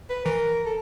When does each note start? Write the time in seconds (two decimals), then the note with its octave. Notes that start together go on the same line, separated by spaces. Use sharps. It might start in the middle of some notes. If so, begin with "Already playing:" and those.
0.10 B4
0.25 E3 A#4
0.65 A4